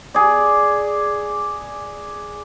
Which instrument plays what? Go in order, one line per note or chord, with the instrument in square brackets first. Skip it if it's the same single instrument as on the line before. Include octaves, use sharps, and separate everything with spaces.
[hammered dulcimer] G#4 D5